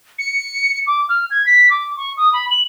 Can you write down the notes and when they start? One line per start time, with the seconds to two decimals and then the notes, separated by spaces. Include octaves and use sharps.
0.19 C#7
0.87 D6
1.09 F6
1.31 G#6
1.46 B6
1.70 D6
1.97 C#6
2.17 D#6
2.33 B5
2.50 F#7